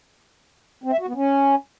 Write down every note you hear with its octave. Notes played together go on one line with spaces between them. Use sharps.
C4
E5
F#4
B3
C#4